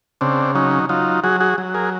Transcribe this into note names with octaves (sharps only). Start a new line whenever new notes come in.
C#3 C4 D4
F#3 C#4 D#4
F#3 D#4 F4
F#3 F#4 G#4
F#4 G#4
F#3
G#4 A#4